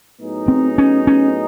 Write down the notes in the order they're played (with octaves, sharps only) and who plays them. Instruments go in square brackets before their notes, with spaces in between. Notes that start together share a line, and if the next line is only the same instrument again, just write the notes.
[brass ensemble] A2 F#3 B3 D#4 G#4
[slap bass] C4
C#4
C#4